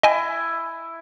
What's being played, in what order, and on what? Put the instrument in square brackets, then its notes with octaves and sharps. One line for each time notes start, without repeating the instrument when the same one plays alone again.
[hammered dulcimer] E4 [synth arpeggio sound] D#5 G5 G#5